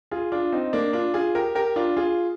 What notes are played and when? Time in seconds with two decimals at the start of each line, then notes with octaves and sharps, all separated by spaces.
0.11 F4 G#4
0.32 D4 F4
0.52 C4 D#4
0.73 A#3 D4
0.93 D4 F4
1.14 F4 G#4
1.35 G4 A#4
1.55 G4 A#4
1.76 D4 F4
1.97 F4 G#4